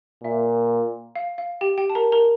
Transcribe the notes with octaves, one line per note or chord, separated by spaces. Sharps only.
A#2 E5
F5
F5
G4 G5
G4 G5
A5
A#4 A#5
A#4 A#5